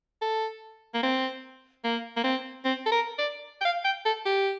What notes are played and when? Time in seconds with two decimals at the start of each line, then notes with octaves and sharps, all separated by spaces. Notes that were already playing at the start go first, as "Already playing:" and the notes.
0.22 A4
0.94 A#3
1.03 C4
1.84 A#3
2.17 A#3
2.24 C4
2.65 C4
2.86 A4
2.92 A#4
3.19 D5
3.61 G5
3.65 F5
3.85 G5
4.06 A4
4.26 G4